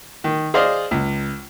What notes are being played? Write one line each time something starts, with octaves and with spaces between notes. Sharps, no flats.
D#3
G#4 C5 D5 D#5 F5
C#2